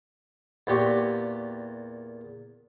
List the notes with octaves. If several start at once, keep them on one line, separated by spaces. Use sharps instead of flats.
E2 A#2 G4 C#6